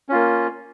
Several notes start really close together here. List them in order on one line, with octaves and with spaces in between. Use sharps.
C#4 F4 A#3